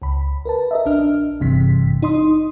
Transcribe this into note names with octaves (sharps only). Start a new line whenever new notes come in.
C#2 B5
A#4 B4 A5
A#4 D#5 E5
A#1 D4 F6
G#1 G2 C3 E3 B6
D#4 D#5 C6 D#6